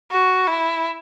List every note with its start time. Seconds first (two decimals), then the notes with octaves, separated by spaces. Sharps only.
0.11 F#4
0.48 E4